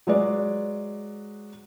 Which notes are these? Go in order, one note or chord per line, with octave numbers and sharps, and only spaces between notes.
F#3 G#3 B4 D5